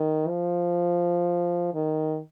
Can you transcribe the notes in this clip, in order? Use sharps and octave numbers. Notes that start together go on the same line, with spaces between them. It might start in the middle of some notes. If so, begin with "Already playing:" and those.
Already playing: D#3
F3
D#3